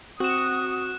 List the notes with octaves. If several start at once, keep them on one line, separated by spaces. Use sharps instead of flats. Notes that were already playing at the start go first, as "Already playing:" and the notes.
C4 F#4 D#6 F#6 E7